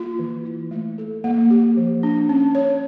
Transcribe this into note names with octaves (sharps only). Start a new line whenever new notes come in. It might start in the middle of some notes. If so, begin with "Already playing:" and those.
Already playing: A#3 F4
E3
E4
A3
A4
A#3
G4
F3
D4
C#4
C#5